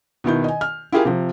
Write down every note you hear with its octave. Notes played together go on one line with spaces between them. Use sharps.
B2 D#3 E4 G6
D#5 G#5
F6
E4 F4 G4 G#4 A#4 F5
C3 F3